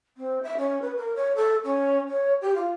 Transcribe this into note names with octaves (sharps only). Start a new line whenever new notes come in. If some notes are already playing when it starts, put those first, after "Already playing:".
C4
E5
C#4
B4
A#4
C#5
A4
C#4
C#5
G4
F4